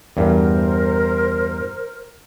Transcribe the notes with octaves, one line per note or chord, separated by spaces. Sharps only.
E2 G2 A#4 C5